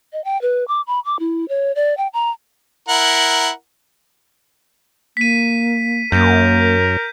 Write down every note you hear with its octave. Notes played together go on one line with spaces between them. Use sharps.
D#5
G5
B4
D6
B5
D6
E4
C#5
D5
G5
A#5
E4 A#4 F#5
A#3 B6 D#7
F#2 A#3 A#4 G6